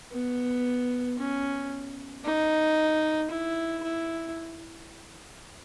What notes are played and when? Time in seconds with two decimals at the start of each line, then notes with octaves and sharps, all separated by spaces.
0.12 B3
1.19 C#4
2.25 D#4
3.30 E4
3.83 E4